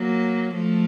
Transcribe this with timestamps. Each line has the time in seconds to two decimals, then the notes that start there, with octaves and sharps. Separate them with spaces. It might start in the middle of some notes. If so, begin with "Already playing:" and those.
Already playing: F#3 A#3
0.54 F3 A3